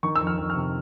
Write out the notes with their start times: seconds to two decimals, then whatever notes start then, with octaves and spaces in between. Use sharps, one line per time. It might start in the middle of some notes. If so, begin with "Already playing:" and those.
0.03 D#3 C#6
0.16 E6
0.21 F2
0.27 F6
0.38 F2
0.50 F6
0.55 C3